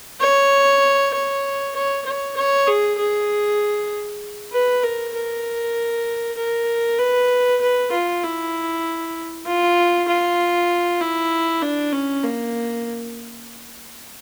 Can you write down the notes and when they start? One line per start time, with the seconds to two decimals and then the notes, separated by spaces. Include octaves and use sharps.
0.21 C#5
1.14 C#5
1.76 C#5
2.06 C#5
2.37 C#5
2.68 G#4
2.98 G#4
4.53 B4
4.83 A#4
5.15 A#4
6.37 A#4
6.99 B4
7.61 B4
7.92 F4
8.23 E4
9.46 F4
10.08 F4
11.01 E4
11.62 D4
11.93 C#4
12.24 A#3